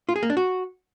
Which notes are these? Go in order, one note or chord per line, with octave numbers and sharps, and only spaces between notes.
F4
G#4
A#3
D4
F#4